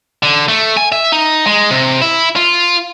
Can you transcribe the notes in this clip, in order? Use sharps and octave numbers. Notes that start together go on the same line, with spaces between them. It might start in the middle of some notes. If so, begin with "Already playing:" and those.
D3
A3
G#5
E5
D#4
G#3
C3
E4
F4